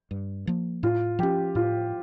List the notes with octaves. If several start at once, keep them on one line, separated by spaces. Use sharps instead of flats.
G2
F3 A#3
A2 F4
F3 C#4 G4
A2 F4